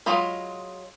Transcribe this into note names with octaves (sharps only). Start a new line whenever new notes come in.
F#3 G#3 F4 D#5 B5